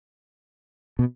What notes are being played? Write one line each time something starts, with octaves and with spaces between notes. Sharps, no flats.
B2